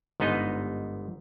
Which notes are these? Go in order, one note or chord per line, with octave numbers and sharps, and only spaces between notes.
G1 G#2 B3 D#4 D#5